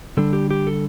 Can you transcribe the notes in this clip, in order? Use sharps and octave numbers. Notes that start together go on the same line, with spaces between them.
D3 G3 D4 A4
G4
G4
A4